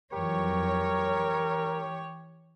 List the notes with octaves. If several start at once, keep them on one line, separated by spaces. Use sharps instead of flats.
F2 E3 F#3 G4 A#4 C#5
E3